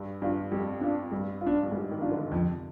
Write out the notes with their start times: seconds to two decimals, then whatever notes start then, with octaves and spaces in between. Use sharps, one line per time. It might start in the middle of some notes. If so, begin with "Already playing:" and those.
Already playing: G2
0.22 G2 D4 F4
0.51 F2 G3
0.81 D4 F4
1.11 G2 G3
1.41 F4
1.47 D4
1.63 G2
1.71 G#2 G3
1.91 D#3
2.01 D4 F4
2.12 D3
2.31 F2 C3